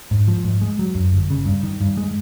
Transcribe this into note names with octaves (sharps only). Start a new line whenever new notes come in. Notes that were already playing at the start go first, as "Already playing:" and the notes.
G#2
F3
G#2
G#3
F#3
F#2
G1
C#3
G2
D#3
G2
G#3